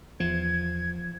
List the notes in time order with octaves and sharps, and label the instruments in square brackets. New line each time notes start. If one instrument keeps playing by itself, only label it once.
[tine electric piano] E2 [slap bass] F3 [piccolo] G#6